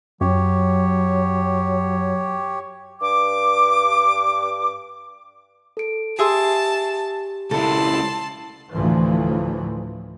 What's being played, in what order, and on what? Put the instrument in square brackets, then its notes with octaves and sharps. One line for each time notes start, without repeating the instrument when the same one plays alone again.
[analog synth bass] F#2 [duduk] F#3 [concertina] G4 C#5
[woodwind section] G2 D6
[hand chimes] A4 D7
[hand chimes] G4 [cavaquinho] G#4 E5 C6 [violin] A5
[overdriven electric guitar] C#2 E4 [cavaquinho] A4 [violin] A5 C6
[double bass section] D2 A2 E3 F3